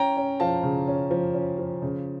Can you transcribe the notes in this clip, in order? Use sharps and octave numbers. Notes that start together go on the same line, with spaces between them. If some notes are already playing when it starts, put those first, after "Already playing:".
Already playing: C#4 G5 A#5
C#4
F3 F5 A5
C#3
C#4
F3
C#4
F3
C#3